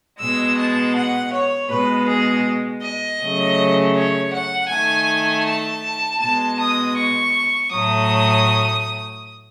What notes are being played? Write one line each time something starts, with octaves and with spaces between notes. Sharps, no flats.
B2 G#3 E6
A5
F#5
C#5
B2 G#3 B4
G#4
D#5
C#3 F#3 A3
C#5
F#5
D#3 A3 G#5
A5
B2 G#3 A5
D#6
C#6
A2 F#3 A3 D#6